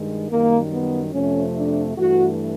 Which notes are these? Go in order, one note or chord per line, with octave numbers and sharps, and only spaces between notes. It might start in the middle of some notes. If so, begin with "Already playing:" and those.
Already playing: G2 D#3 G#3
F#2 D#3 G3 A#3
B3
F2 C3 F3 A3 C#4
D4
G2 E3 A3 F#4